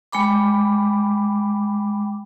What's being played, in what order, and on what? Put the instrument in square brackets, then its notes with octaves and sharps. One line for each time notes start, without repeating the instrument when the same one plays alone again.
[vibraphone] G#3 G5 B5 D6